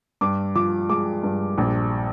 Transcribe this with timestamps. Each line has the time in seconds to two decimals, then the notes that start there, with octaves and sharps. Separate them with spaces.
0.21 G2 D6
0.55 F3 D6
0.89 G#3 D6
1.24 G2
1.58 A#1